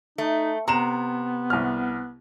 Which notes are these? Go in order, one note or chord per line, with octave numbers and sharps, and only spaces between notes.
A3 D#4
C3 B3 A#5 E7
C2 F6